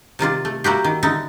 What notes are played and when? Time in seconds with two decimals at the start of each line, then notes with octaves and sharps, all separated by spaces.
0.19 C3 D#3 F4 D5
0.45 A3
0.64 A#3 E4 F#4 G4
0.84 D#3
1.03 D3 D#4 E4